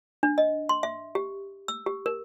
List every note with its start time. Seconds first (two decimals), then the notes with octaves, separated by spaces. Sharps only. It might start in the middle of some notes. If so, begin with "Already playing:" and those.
0.23 D4
0.38 D#5
0.69 C6
0.83 E5
1.15 G4
1.68 E6
1.86 G4
2.06 A#4